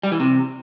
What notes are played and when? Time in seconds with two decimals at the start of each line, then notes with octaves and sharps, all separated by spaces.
0.03 G3
0.12 E3
0.20 C3